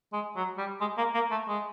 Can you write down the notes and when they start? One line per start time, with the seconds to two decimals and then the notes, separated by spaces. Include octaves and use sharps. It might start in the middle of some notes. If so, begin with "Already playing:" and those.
0.13 G#3
0.36 F#3
0.58 G3
0.81 G#3
0.97 A#3
1.14 A#3
1.31 A3
1.48 G#3